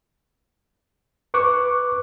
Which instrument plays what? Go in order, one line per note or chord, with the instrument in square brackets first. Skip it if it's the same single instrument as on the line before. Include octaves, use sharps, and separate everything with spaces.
[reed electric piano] B4 C#6 D6 F#6